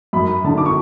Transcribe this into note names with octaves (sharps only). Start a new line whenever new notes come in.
F#2 B5
D3 A5
D6
C#6